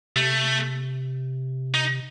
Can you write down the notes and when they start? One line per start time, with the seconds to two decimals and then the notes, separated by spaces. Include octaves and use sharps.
0.16 C3 A3
1.74 D#4